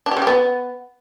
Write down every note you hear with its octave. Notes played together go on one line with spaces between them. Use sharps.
D4
G4
C#3
G4
B3